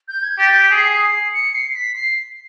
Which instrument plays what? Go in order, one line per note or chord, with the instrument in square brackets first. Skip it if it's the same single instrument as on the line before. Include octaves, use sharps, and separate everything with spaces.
[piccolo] G6
G#6
[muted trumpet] G4 [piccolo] A6
[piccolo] B6
[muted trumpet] G#4 [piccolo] C7
[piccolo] C#7
C7
B6
C7